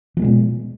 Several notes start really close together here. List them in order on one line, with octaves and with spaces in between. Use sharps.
F3 A#3 G#3 B2